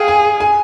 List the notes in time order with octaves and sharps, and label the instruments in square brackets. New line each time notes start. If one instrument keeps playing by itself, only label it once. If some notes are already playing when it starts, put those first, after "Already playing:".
Already playing: [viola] G#4 [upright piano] F5 G5
[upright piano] G#5
G#5